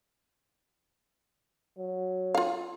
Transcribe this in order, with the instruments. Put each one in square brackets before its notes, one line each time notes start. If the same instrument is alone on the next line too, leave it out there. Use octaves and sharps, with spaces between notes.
[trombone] F#3
[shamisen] F4 F5